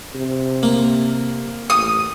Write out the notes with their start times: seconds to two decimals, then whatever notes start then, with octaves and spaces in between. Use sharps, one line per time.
0.15 C3
0.63 A#3
1.70 A1 D#6